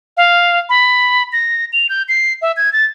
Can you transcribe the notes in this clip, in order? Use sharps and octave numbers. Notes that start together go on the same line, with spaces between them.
F5
B5
A#6
F7
G6
C7
E5
G#6
A6